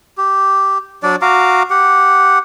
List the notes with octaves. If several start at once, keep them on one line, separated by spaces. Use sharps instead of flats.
G4
F#3 D4 D5
F#4 F5 A#5 D6
G4 F#5